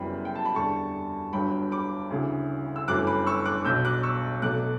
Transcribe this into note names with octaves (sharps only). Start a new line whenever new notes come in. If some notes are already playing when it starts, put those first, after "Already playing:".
Already playing: F#1 F#2 E3 G3 B3 G5 B5
G5
A5
B5
E2 D3 G3 A5 C#6
G1 G2 F#3 G5 B5
B5 D6
D2 C#3 E3
E6
G1 F#2 E3 A3 D6 F#6
B5 D6
C#6 E6
D6 F#6
B1 B2 F#3 E6 G6
D6 F#6
C#6 E6
B1 B2 F#3 A3 D6 F#6